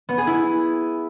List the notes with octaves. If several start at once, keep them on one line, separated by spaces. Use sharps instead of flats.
B3
G#4
E4